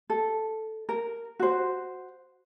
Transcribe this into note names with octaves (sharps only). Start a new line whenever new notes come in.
A4
A#4
F#4 C5